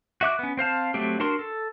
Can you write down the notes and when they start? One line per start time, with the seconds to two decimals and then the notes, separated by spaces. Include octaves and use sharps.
0.21 F#4 E5 D6 F#6
0.39 B3 C#4
0.57 C4 C5 F5 A5
0.94 F#3 A3 C4 G4
1.20 D4 F#4 A#4 C6
1.39 A4